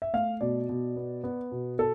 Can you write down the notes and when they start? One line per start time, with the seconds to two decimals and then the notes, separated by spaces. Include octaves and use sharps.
0.02 E5
0.13 A3 F5
0.41 B2 D5
0.69 B2
0.96 B3
1.24 B3
1.52 B2
1.79 A4